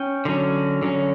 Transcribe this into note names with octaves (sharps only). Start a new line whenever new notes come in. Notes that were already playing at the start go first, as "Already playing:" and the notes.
Already playing: C#4 G5
D3 F#3 C#4
D3 F#3 C#4